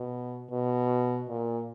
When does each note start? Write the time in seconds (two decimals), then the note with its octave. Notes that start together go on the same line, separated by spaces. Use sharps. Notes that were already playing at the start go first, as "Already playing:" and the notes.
Already playing: B2
0.51 B2
1.28 A#2